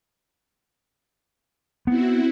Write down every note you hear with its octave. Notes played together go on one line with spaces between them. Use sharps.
B3 C4 E4 F#4